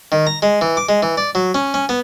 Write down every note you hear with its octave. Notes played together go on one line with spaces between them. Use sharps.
D#3
A#5
G#3
E3
D6
G#3
E3
D5
F#3
C#4
C#4
B3